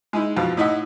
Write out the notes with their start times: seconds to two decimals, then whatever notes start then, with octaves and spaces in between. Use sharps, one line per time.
0.13 G#3 D#4 E4
0.37 F2 B2 F3
0.57 A2 D#4 E4 D#5 E5 F#5